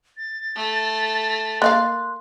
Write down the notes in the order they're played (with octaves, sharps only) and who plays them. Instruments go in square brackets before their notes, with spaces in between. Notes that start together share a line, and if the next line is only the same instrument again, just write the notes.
[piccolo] A6
[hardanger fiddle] A3
[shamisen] A#3 E5 F5 [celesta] C6 F#6